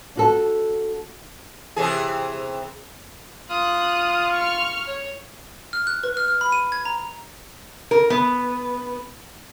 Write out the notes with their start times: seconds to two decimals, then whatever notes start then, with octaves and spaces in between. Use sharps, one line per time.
0.15 D4 F#4 A4
1.76 C3 E3 G#4
3.50 F4 D#6 F#6
4.33 C#6 F6
4.87 C#5
5.73 F6
5.87 F#6
6.03 B4
6.17 F6
6.28 F6
6.41 B5
6.52 D#7
6.72 G#6
6.85 A#5
7.91 A#4
8.10 B3